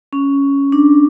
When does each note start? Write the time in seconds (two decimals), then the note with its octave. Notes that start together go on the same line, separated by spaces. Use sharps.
0.13 C#4
0.72 D4